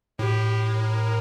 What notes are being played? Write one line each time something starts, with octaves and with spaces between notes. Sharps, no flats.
A2 G4
A#4